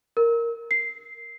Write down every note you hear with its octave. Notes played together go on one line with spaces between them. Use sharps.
A#4
C7